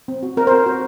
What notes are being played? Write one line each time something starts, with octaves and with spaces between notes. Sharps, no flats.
C4
F#4
C4 A#4
C5
F#4
F#4